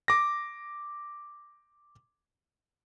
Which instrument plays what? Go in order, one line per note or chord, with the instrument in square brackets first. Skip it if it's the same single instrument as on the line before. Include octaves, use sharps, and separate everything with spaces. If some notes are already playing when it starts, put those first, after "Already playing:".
[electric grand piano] D6 A#6